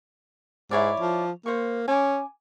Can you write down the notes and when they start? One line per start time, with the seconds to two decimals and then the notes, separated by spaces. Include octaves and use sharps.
0.71 G#2 E4 C#5 D5
1.00 F3
1.46 A#3 C5 C#6
1.88 C#4 G#5 D6